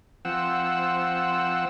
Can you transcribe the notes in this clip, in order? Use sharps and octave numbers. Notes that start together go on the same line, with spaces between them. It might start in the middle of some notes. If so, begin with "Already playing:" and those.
F3 C4 F#5 E6